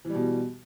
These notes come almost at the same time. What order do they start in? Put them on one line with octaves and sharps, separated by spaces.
E3 G3 B2